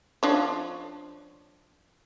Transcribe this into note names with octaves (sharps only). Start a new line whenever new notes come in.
F3 D4 C#5